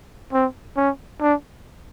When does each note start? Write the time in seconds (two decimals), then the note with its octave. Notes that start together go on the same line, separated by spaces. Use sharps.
0.33 C4
0.77 C#4
1.21 D4